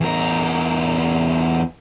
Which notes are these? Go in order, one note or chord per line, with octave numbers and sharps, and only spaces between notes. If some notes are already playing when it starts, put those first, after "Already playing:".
E2 A#4